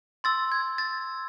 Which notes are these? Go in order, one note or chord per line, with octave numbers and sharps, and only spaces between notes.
C6 E6 A6
G#6
A6